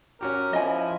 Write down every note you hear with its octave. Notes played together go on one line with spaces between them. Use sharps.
C#4 F#4 G4 A#4
F3 E4 D#5 G#5